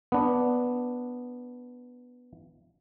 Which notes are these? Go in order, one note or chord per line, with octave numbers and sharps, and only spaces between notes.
B3 D4